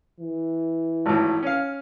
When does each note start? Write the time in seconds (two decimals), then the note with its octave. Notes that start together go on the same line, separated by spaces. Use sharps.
0.20 E3
1.06 G#1 A2
1.43 C#4 F5